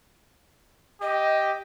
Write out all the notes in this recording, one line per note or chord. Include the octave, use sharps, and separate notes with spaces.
G4 D#5